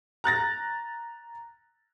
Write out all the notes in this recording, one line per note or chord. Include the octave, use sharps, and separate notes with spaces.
A#5 F#6 A6 A#6